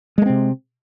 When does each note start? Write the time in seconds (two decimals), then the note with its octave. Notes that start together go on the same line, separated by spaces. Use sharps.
0.18 G#3
0.22 A3
0.26 C4
0.30 C3